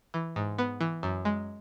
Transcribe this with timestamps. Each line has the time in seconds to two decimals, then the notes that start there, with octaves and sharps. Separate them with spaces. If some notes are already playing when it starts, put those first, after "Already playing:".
0.14 E3
0.36 G#2
0.58 B3
0.81 E3
1.03 F#2
1.25 G#3